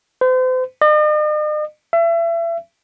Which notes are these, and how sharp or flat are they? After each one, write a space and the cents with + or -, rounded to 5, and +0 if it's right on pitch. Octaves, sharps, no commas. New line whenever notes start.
C5 -40
D#5 -45
E5 +35